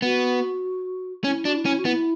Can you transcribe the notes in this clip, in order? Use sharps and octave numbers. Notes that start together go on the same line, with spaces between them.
B3 F#4
C#4 E4
D4 F#4
E4
C#4
F#4
B3 E4